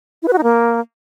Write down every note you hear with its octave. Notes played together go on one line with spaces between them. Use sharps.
E4
B4
F#4
D#4
A#3